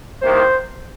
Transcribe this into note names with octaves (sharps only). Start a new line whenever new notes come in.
C2 C3 D#3 A#3 C5